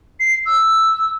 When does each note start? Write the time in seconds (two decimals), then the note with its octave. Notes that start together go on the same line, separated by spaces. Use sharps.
0.20 C7
0.46 E6